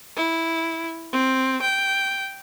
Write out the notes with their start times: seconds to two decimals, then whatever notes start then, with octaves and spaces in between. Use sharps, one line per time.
0.16 E4
1.12 C4
1.61 G5